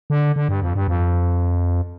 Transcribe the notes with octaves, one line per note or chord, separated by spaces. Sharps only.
D3
D3
G2
F2
G2
F2